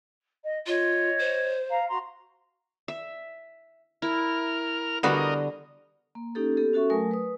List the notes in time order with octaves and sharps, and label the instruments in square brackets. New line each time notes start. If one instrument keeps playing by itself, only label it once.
[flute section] D#5
[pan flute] F4 [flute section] C#5 D#5
[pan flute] C5
[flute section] F5 A#5
F#4 A#5 C6
[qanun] E5
[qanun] E4 [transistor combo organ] A#4 F6
[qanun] D3 [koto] G3 B3 F#4 [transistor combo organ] A#4 D#5
[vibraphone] A#3
A#3 C#4 D#4 G4 A4
B3 G4 A4
C#4 F#4 A4 E5 C#6
F#3 A3 A#4 G#5 D#6
B4 D#6